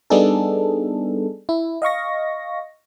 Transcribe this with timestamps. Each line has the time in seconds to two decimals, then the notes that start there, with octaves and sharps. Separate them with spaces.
0.10 G3 B3 D4 D#4 G#4 A4
1.49 E4
1.82 D#5 F5 C#6 A#6